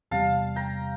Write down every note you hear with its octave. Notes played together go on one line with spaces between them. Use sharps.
E2 C3 G3 F5 A5
G5 A#5